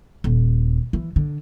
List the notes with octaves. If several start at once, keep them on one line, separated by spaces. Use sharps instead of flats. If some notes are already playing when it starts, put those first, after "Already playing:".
D#1
E3
D3